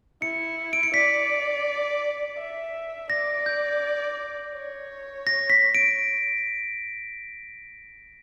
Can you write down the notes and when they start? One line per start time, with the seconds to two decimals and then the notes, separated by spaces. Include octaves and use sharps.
0.22 E4 C#7
0.73 D7
0.83 C#7
0.94 D5 B6
2.38 E5
3.10 D5 A#6
3.46 G6
4.54 C#5
5.27 A#6
5.50 B6
5.74 D7